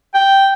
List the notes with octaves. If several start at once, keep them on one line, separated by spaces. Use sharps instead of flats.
G5